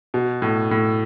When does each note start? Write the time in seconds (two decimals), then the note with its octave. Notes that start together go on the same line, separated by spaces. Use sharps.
0.14 B2
0.42 A2
0.71 A2